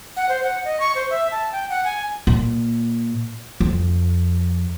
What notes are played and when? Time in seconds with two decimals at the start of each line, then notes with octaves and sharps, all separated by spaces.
0.16 F#5
0.29 C5
0.43 F#5
0.65 D#5
0.80 C#6
0.95 C5
1.10 E5
1.32 A5
1.52 G5
1.70 F#5
1.85 G#5
2.27 A#2
3.60 F2